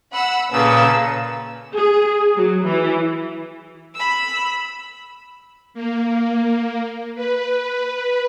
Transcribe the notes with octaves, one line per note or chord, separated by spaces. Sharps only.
F#5 B5 E6
A#2 C#3 A4 B4 E6
G#4
F#3
E3
B5 E6
A#3
B4